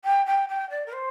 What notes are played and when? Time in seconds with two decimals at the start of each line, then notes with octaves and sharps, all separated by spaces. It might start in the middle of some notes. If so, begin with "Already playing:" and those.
0.05 G5
0.26 G5
0.49 G5
0.70 D5
0.86 A#4
0.93 C5